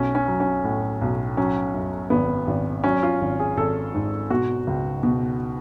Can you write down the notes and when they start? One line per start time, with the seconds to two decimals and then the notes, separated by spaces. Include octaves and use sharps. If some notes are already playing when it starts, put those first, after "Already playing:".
Already playing: B1 C#4
0.15 C#4
0.28 F#3
0.40 C#4
0.64 A2
1.02 B1
1.37 F#3 C#4
1.74 F#2
2.10 G#1 B3
2.47 G#1
2.84 F#3 C#4
3.03 F4
3.21 G#1
3.40 G#4
3.57 G#1 A4
3.94 G#2
4.30 B2 F#4
4.67 C#2
5.03 B2